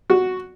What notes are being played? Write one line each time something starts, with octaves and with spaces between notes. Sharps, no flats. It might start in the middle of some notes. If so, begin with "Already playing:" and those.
F#4